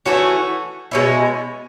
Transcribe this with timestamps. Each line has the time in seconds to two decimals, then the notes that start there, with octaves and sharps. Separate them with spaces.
0.05 E3 A3 C#4 F#4
0.91 B2 G#3 C#4 E4